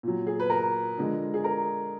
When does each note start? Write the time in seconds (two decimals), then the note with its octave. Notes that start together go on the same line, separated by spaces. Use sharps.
0.03 A#2 F#3
0.27 G#4
0.40 B4
0.50 A#4
0.98 D3 F3 G#3
1.34 G#4
1.44 A#4